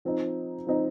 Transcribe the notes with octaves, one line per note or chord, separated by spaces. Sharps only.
F3 C4 D#4
F3 C4 D#4